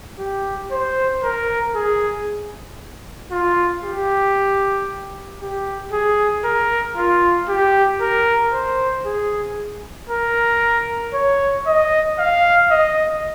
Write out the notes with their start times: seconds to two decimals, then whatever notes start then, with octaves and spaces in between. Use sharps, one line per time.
0.19 G4
0.72 C5
1.23 A#4
1.75 G#4
3.32 F4
3.83 G4
5.41 G4
5.92 G#4
6.44 A#4
6.97 F4
7.49 G4
8.01 A#4
8.53 C5
9.06 G#4
10.10 A#4
11.14 C#5
11.67 D#5
12.19 F5
12.71 D#5